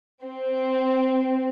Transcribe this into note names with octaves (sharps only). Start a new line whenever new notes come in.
C4